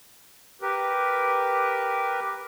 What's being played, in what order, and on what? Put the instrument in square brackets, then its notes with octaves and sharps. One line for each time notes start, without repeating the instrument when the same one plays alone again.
[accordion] G4 A#4 B4